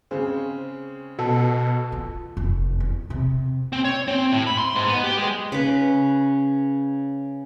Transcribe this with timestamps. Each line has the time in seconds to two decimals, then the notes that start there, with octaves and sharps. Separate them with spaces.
0.11 C#3 G#3 C4
1.18 B2 A4
1.92 F4
2.37 F1
2.80 E2
3.10 C3
3.73 C4
3.85 C#5
4.08 C4
4.32 A2
4.47 B5
4.58 C6
4.76 G#2
4.88 B3
5.03 G4
5.17 G#3
5.52 C#3 B4